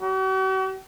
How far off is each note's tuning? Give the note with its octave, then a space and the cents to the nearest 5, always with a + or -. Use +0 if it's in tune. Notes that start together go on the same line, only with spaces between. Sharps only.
F#4 +45